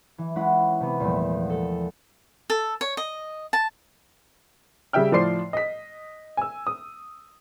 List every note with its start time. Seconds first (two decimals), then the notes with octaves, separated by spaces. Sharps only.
0.18 E3
0.36 G#3 C#4 E4 F#5 B5
0.80 C3 B3
1.00 E2 A#2 F3 G3 A3
1.50 A4
2.50 A4
2.81 C#5
2.97 D#5
3.53 A5
4.93 C#3 G3 G#4 E5 G5 F6
5.12 A2 F3 C5 D5 C6 C7
5.53 D#5 B6
6.37 G#5 E6
6.67 D#6